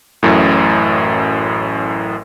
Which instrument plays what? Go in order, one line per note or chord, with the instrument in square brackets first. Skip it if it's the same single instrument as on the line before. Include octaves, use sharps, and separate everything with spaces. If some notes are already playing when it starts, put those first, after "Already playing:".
[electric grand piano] A1 F#2 A2